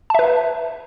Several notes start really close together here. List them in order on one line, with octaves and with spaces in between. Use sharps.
A5 E5 B4